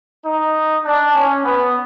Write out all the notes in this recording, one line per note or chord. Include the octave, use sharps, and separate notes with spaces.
D#4
D4
C#4
B3